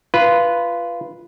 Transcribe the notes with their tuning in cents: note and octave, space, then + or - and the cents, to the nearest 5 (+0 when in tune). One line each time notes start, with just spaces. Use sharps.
F4 -20 B4 -5